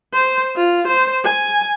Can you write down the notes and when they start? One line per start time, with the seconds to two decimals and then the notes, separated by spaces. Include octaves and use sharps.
0.13 C5
0.56 F4
0.88 C5
1.25 G#5